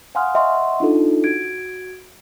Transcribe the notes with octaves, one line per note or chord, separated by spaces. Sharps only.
F5 F#5 G#5 C6 D#6 F6
D#5 E5 F#5 C6 C#6
D4 D#4 F4 A4
F#4 G#6 D7